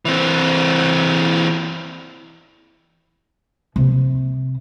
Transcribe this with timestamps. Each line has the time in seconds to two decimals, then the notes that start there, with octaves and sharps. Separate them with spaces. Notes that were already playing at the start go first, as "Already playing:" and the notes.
0.05 E3 C4
3.76 C3